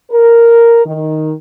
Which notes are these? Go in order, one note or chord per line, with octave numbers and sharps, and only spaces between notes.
A#4
D#3